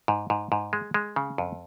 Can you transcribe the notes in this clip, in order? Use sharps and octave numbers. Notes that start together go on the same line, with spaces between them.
G#2
G#2
G#2
G#3
G#3
C#3
F2